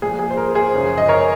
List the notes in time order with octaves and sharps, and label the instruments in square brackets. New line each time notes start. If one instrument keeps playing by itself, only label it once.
[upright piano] A#2 F3 G#4
G#4
C5
A#4
G#4 C5
F#2 C#3 F3
D#5
A#4 C#5